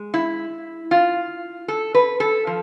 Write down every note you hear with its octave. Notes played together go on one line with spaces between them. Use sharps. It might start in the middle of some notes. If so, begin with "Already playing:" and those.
Already playing: G#3
E4
F4
A4
B4
A4
F3